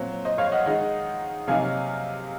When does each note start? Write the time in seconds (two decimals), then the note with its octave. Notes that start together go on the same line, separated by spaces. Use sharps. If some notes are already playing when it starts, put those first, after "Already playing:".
Already playing: A#2 F#3 C4
0.25 C5 D#5
0.38 C#5 F5
0.52 D#5 F#5
0.66 D#3 G#3 D#4
1.48 C3 F#3 A#3 D#4 F5 G#5